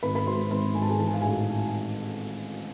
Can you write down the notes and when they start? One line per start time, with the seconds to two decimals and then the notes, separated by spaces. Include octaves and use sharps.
0.03 G#1 B4 B5
0.15 B4 B5
0.27 G#3 C5 C6
0.51 G#1 B4 B5
0.75 G#2 G#5
0.82 A5
0.89 G#4 G#5
0.99 E3 A5
1.07 G#5
1.14 F5
1.21 A1 G#4 G#5